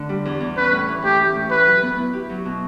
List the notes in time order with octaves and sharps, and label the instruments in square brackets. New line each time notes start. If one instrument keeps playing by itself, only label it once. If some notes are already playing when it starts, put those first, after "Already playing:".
Already playing: [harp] D3 A3
G3
E2
E2
[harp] C#4 [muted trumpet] B4
[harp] A2
E3
[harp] A3 [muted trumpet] G4
[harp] C#4
A2
[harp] G4 [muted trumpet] B4
[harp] F#3
B3
E4
G4
F#3
B2